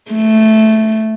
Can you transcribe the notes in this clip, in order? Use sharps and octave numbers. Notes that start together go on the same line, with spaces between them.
A3